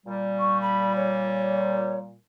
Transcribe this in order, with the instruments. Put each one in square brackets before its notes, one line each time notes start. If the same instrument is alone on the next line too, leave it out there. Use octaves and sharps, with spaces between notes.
[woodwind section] A#2 G3
[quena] C#6
B5
C#5